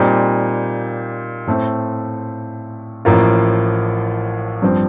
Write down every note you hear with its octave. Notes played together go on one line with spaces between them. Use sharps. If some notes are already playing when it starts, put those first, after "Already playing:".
Already playing: A#2 G3 C4 D#4 G4
A2 A3 C4
A1 A2 F3 A#3 F4
G2 F3 C4